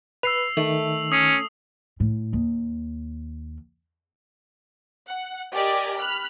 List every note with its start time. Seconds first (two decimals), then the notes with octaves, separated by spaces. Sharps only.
0.23 B4 E6 C7 F7
0.57 D#3 A3 F#7
1.12 C#4 D#6 C7
2.00 A2
2.33 D#2
5.09 F#5
5.52 G4 A#4 D5 D#5 G#5
5.96 B5 F6 F#6